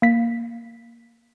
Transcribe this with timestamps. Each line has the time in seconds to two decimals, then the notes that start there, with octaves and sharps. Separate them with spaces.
0.02 A#3 B6